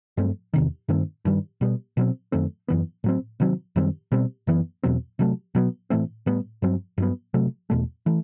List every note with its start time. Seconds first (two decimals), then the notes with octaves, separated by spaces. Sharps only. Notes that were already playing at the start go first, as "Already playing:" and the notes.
0.17 G2 F#3 A3 C4
0.53 E2 C3 D#3
0.88 G2 D#3 A3 C4
1.25 G2 D#3 G3
1.61 B2 G3 B3
1.97 B2 F#3 C4
2.32 F#2 D#3 A3 C4
2.68 F#2 E3 B3
3.04 A2 F#3 C4
3.40 C3 D#3 F#3 C4
3.76 F#2 D#3 G3 C4
4.12 B2 G3 C4
4.47 F#2 E3 B3
4.83 E2 B2 F#3 C4
5.19 C3 F#3 A3
5.55 B2 F#3 B3
5.90 A2 E3 A3 C4
6.26 A2 G3 B3
6.62 G2 F#3 C4
6.98 G2 F#3 B3
7.34 C3 F#3 A3
7.70 E2 B2 A3
8.06 E3 A3